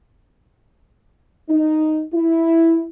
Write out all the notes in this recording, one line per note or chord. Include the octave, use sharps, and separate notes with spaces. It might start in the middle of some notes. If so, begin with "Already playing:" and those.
D#4
E4